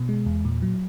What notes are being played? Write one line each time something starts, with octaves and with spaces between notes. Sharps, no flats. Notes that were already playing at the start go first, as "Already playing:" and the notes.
Already playing: B2
G#3
E2
A#2
F#3